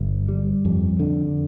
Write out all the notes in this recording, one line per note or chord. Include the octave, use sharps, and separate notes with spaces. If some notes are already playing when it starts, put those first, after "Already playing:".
Already playing: G1
G3
F2
D3